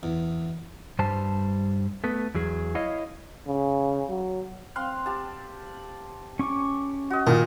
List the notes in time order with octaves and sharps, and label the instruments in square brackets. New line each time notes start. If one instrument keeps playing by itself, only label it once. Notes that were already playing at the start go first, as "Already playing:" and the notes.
[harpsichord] E2
[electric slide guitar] G2 G3 C5 A5
A3 B3
E2 F#3 G#4
E4 C#5 D#5 F5
[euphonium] C#3
F#3
[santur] C4 F5 C6 [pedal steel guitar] F#6
[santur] G4 A5
[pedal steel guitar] C#4 C#6 D6
[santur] F#4 D#5
[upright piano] A#2 [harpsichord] D#3